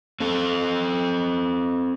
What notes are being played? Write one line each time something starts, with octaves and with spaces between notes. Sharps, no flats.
C4 A4